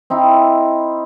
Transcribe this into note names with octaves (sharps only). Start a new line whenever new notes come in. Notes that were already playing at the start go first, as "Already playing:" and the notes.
C4 D#4 E4